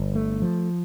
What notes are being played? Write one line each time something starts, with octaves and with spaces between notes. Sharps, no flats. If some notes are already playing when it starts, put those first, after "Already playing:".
Already playing: G1
A3
F3